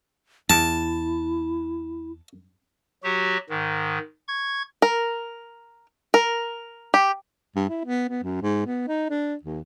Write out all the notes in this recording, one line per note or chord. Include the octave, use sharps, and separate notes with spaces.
E2 E4 A5
F#3 F#4 G4
G#2 D#3
C#6 G#6
A#4
A#4
G4
G2
E4
B3
B3
F#2
G#2
B3
D#4
D4
D#2